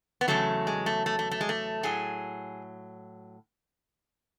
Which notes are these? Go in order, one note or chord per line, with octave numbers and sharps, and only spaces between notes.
B3
E2 C#3 F#3 A3
G#3
A3
A3
A3
A3
G#3
A3
A2 F#3 G#4